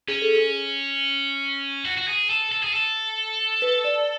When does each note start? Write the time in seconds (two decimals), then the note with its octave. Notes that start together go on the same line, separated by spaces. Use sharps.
0.08 C#4 G#4
0.22 A4
0.35 G#4
1.85 F#4
1.98 F#4
2.08 G#4
2.30 A4
2.52 A4
2.63 G#4
2.74 A4
3.62 B4
3.84 D5